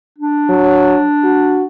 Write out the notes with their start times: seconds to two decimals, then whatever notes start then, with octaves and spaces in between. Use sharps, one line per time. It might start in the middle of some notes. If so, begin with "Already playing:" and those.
0.18 D4
0.49 F#3
1.24 F#4